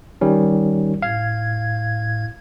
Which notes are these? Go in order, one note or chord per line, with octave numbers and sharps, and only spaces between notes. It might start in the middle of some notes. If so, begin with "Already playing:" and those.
D#3 G3 C#4
A2 F5 G#6